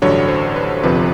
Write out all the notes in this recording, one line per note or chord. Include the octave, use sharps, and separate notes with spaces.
A1 G2 D3 F#3 C#5
C5
B4
G1 F2 C3 F3 B4